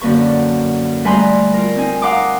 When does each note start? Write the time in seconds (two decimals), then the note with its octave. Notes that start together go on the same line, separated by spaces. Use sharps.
0.01 F#2 D3 A#3 B4 C#6
1.04 G3 A3 B4 G#5 A#5 C6
1.54 F4 A#4
1.76 C4 D#4 G#5
2.02 F5 F#5 A#5 C6 D6 D#6